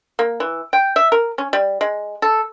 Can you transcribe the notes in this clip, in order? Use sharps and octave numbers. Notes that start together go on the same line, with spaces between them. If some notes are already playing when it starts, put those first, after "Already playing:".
A#3
E3
G5
E5
A#4
C#4
G3
G#3
A4